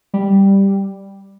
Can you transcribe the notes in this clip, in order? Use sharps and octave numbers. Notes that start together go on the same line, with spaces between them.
G3